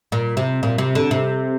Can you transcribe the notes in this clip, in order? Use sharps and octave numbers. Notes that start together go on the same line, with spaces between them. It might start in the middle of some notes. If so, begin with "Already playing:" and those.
A#2
C3
A#2
C3
D3
C3